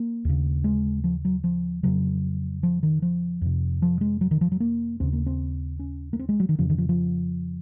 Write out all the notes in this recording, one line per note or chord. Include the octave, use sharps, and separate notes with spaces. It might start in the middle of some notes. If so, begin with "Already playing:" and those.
Already playing: A#3
D#2 C#3
G#3
F3
F#3
F3
F2 C#3 F#3
F3
D#3
F3
F2 C3
F3
G#3
F#3
D#3
F3
F#3
A#3
D#2 C#3 C4
A#3
C4
C#4
A#3
C4
G#3
F#3
D#3
F2 C#3 F3
D#3
F3
F3